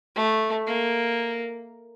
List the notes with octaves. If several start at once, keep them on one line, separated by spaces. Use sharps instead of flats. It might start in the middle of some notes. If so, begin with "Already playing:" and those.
A3
A#3